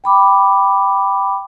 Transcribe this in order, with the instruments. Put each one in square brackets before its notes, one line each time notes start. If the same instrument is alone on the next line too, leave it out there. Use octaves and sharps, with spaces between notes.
[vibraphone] G5 B5 D6